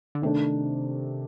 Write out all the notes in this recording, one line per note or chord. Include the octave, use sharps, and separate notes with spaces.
D3
C3 D#3 A3 D4